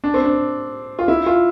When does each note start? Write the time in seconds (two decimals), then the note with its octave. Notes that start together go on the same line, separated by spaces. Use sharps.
0.04 D4
0.14 C4
0.25 D4
0.99 F4
1.08 E4
1.26 F4